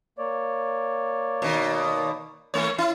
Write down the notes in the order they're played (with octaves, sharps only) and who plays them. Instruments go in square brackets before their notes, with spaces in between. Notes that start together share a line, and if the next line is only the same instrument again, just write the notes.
[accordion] A#3 C#5 D5
[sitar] B2 D#3
E3 A3 C#5
E4